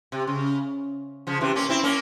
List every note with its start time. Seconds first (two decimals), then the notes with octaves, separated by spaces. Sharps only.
0.12 C3
0.27 C#3
1.27 C#3 F3
1.41 C3 E3
1.56 A#3 C#4
1.69 C4 E4
1.84 A#3 C#4